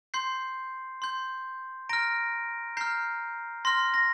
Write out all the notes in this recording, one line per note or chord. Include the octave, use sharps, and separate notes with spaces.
C6 G6 C7
C6 G6
A#5 F6 A#6 D7
A#5 F6 G6 C7
C6 F6 A#6
A#6